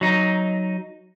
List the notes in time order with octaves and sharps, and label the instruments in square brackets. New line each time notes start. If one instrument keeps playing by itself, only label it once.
[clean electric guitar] F#3 D#4